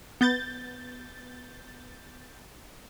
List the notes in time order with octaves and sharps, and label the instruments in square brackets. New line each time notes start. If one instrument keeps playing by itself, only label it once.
[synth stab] B3 G6 A6